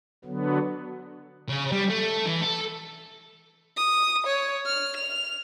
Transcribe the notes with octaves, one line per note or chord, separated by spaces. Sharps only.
D3 F#3 B3
C#3
G3
A3
E3
A4
D#6
C#5
F6
F7